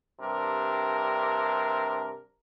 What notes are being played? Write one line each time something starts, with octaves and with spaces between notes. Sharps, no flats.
G2 C3 D4 A#4